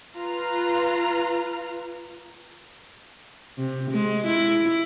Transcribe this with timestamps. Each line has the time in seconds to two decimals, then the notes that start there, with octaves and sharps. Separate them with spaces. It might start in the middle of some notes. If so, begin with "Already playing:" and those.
0.15 F4 B4 F5 A#5
3.58 C3
3.91 G#3
4.26 E4